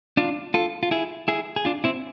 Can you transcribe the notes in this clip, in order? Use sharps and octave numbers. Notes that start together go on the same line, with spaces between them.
D4 F4
F4 A4
F4
E4 G#4
E4 G#4
G#4
D4 F4
C4 E4